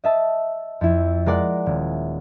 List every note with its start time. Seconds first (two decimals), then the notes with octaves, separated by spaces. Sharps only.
0.04 D#5 E5 A5
0.81 F2 E4
1.26 G#3 A#4 D5 F#5
1.66 D#1